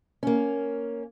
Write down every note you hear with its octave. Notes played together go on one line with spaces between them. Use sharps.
A#3 C#4